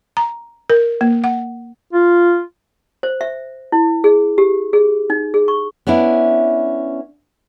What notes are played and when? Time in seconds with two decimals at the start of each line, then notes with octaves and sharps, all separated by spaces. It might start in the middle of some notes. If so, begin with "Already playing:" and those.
0.17 A#5
0.70 A#4
1.01 A#3
1.24 F#5
1.93 F4
3.03 C5
3.21 E5
3.72 E4
4.04 G#4
4.38 G4
4.73 G#4
5.10 D#4
5.34 G#4
5.48 C#6
5.87 B3 C#4 D4 E4